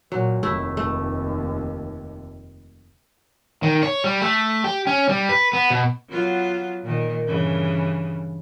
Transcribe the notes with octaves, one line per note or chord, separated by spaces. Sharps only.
A#2 F#3
F1 D#2 A3 E4
A3
D#3
C#5
G3
A3
G4
C#4
G3
B4
B3
B2
F#3 B3 F4
A#2 D#3
G2 C#3 E3